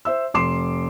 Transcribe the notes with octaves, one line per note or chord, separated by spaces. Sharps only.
C5 E5 E6
F1 C6 D6 C7 E7